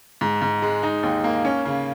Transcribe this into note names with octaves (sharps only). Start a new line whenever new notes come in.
G#2
G#2
G#3
D#4
D#2
A#3
C#4
C#3